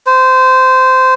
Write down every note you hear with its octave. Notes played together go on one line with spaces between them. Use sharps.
C5